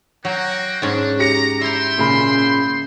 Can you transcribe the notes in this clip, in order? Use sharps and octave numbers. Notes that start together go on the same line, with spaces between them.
F#3 A#3 F#4 G5
G#2 C#4 D4
G4 A#5 C#7
E4 E5 G5 A#5 C6
A#2 C#3 B5